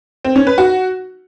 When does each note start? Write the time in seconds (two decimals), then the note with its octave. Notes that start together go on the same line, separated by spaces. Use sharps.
0.25 C4
0.36 C#4
0.47 B4
0.58 F#4